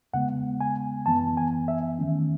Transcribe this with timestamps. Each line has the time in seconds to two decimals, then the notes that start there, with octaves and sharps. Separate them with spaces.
0.13 E2 C#3 G#3 B3 F#5
0.61 G#5
1.06 F#2 E3 B3 A5
1.37 G#5
1.68 E5
1.99 E2 D#3 A3 C#4